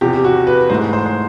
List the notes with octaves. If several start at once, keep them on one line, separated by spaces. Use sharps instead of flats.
E2 C3 F3 G4
F#4
B4
G#2 E3 A3 C5
C5
C5